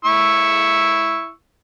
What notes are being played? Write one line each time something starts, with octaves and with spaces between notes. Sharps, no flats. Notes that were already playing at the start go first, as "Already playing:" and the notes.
E4 C#6 E6